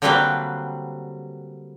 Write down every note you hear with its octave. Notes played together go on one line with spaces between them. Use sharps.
D3 F#3 G3 A#3 C4 B4